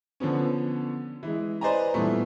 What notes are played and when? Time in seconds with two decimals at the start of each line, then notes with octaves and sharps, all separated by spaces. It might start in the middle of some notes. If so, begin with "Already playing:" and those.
0.20 D3 F3 B3 C#4
1.23 E3 G#3
1.61 B4 C5 D5 D#5 G#5 A#5
1.94 G2 A#2 E3 A3 B3